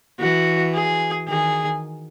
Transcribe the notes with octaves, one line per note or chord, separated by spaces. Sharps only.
E3 F#4
G#4
D#3 G#4